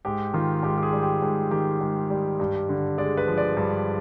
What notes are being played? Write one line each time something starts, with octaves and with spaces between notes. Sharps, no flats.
G#2 G4
D#3 F4
G#2 G4
G4
G#4
G3
G4
G#2
D#3 G4
G#2
G3
G2
D3
G#3 D5
B4
F3
D5
G2